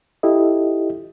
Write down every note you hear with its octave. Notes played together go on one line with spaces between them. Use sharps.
E4 F4 G4 A4 D#5